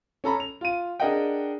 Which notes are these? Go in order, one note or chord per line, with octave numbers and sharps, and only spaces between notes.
C#4 A4 A#5 B5
F7
F4 D#7
D4 G#4 A#4 D#5 F#5 G5